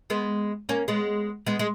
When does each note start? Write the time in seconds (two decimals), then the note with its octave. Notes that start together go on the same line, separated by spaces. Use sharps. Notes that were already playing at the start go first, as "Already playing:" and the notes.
0.10 G#3 B3
0.69 A#3 C#4
0.88 G#3 B3
1.46 G#3 B3
1.59 G#3